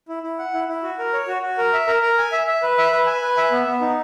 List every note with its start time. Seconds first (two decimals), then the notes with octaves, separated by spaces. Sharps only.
0.09 E4
0.23 E4
0.39 F#5
0.54 E4
0.68 E4
0.83 F#4
0.99 A#4
1.13 C#5
1.28 F#4
1.42 F#4
1.58 A#4
1.73 E5
1.87 A#4
2.02 A#4
2.18 G#5
2.32 E5
2.47 E5
2.63 B4
2.78 E5
2.92 B4
3.07 G#5
3.22 B4
3.37 E5
3.52 B3
3.67 B3
3.81 D#4